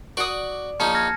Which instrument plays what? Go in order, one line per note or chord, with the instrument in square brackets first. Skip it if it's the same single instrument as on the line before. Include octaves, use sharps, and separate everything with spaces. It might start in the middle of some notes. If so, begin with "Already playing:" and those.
[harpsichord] F#4 [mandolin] D5 D#6
[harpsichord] A#1 C#4 D#4 [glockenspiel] A5 C#7
[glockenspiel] F6 G#6 A#6